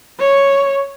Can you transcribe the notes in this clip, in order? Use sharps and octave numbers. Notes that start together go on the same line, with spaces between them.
C#5